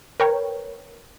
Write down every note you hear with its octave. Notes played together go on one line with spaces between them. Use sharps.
A#4 B4 C#5 G5